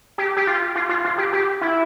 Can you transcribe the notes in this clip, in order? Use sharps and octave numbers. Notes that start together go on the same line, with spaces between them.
G4
G4
F4
F4
F4
F4
G4
G4
E4